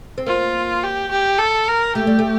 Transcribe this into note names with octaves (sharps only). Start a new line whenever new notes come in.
C4
A#3 F4
G4
G4
A4
A#4
A3 G4
G3
A3